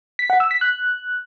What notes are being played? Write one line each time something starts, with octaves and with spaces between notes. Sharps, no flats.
B6
F#5
E6
B6
F#6